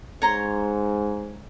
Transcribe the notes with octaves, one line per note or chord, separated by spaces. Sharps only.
G#2 C#5 A#5 C6